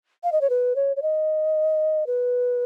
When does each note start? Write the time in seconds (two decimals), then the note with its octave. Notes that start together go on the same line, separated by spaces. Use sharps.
0.23 F5
0.32 D#5
0.41 C#5
0.50 B4
0.76 C#5
0.96 C#5
1.02 D#5
2.07 B4